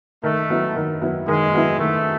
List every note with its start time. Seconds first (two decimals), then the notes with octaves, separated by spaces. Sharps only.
0.23 D#3 A3
0.50 F#3 B3 E4
0.76 D#3
1.02 F#3 B3 E4
1.27 D#3 G#3
1.53 F#3 B3 E4
1.79 D#3 A3